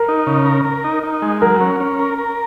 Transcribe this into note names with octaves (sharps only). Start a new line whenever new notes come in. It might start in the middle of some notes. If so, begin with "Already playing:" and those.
Already playing: A#4
D#4
C#3
A#4
A#4
D#4
D#4
G#3
F#3 A#4
C#4
C#4
A#4
A#4